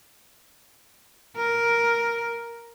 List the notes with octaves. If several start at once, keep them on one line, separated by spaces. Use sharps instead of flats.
A#4